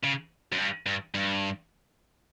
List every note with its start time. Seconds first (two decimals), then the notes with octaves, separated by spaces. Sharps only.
0.03 C#3
0.52 F#2
0.58 G2
0.86 G2
1.15 G2